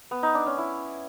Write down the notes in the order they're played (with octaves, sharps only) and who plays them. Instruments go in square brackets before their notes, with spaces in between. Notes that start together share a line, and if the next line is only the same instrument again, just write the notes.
[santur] B3
D#4
D4
C#4
E4